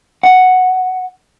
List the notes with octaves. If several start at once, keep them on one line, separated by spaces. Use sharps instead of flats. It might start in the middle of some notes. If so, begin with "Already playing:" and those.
F#5